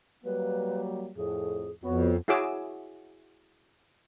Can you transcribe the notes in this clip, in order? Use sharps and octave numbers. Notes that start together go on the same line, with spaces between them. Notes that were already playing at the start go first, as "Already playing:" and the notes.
F#3 G3 A#3 B4
F2 A2 G#4
F2 B3 F#4 C#5
E4 F#4 G#4 C#5 D6 E6